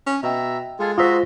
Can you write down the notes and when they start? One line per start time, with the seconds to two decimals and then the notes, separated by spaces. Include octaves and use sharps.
0.07 C#4
0.23 B2 D#5 E5 G5 A#5
0.80 G#3 F4 G#4 A4
0.98 F4 F#4 C5 A#5 C6 D#6 E6 B6